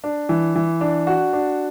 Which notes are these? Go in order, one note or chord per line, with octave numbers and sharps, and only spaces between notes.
D4
E3
E3
D4
F#4
D4